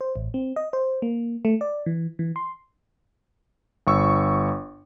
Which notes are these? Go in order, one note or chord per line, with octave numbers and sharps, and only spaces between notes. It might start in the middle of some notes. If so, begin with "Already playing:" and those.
C5
A1
C4
D#5
C5
A#3
A3
D5
E3
E3
C6
G1 C#6 E6